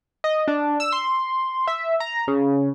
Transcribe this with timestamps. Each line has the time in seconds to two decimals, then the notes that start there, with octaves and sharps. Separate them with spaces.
0.24 D#5
0.48 D4
0.80 E6
0.92 C6
1.67 E5
2.00 A#5
2.28 C#3